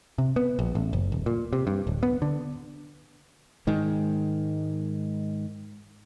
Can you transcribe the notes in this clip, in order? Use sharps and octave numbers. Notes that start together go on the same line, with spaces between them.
C3
B3
A#1
A1
F#1
D#1
A#2
C3
G2
D1
B3
D3
G#2 D#3 G#3